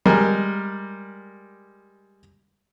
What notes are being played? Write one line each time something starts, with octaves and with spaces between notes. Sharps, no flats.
G3 G#3 A#4